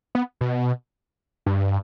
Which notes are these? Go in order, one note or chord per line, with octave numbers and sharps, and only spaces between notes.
B3
B2
G2